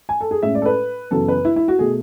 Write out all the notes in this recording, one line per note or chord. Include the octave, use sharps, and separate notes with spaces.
G#5
A4
G#4
A2 G#3 C#4 E5
D5
A4
B4
F#2 C#3 E3 B3 A4
B4
E4
E4
F#4
B2 A3 G#4